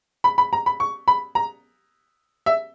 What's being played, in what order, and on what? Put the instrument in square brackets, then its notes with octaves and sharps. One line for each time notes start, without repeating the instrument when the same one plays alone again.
[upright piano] B5
B5
A#5
B5
C#6
B5
A#5
E5